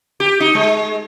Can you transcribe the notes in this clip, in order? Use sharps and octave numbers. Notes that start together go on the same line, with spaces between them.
G4
D#4
G#3